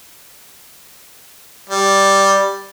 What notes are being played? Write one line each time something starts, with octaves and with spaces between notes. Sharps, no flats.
G3